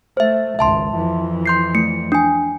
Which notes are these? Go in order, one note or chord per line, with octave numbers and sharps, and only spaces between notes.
A3 C5 E5
G#1 C#2 E5 A5 C6
F2 E3
C6 G6 C7
A3 C#7
D4 G#5